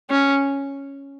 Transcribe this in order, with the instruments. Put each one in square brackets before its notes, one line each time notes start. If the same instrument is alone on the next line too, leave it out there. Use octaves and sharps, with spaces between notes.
[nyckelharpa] C#4